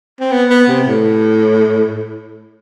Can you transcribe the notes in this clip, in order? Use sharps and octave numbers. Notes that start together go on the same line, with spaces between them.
C4
B3
B3
C3
A2